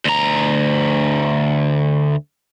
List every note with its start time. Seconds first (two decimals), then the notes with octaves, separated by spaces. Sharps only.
0.05 D2 A#5